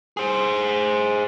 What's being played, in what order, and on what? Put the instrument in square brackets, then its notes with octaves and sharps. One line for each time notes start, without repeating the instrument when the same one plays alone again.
[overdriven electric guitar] G#4 C5